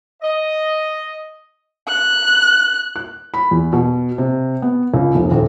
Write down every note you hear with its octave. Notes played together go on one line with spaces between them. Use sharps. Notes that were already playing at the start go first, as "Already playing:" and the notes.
D#5
F#6
F#6
B5
E2
B2
C3
B3
C#2
F1
D#1